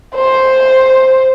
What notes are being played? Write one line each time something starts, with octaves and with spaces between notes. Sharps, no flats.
C5